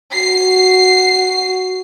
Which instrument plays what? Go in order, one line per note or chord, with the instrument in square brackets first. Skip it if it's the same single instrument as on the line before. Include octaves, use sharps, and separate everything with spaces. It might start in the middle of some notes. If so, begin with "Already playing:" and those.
[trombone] F#4 [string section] C7